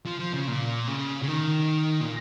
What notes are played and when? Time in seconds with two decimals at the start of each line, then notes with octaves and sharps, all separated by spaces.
0.06 F3
0.19 F3
0.33 C#3
0.47 A#2
0.87 C#3
1.22 C#3
1.28 D#3
2.01 A#2